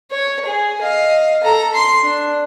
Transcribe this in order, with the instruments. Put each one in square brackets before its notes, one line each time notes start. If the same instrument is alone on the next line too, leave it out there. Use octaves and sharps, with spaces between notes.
[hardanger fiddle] C#5
G#4
D#5 F5
A4 A#5
C6
D4